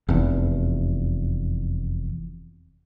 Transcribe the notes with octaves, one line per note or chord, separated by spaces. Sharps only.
F1 E2